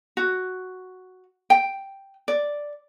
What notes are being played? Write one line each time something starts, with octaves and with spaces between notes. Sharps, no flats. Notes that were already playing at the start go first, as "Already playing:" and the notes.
F#4
G5
D5